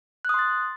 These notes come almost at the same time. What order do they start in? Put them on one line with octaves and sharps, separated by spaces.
F#6 D#6 C6 A6